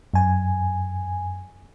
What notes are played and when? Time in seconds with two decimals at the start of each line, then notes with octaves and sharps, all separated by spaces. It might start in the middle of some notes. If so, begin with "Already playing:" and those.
0.14 F#2 G#5